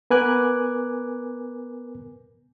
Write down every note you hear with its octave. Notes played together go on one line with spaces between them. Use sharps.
B3 A#4 B4 G#5 D6 F#6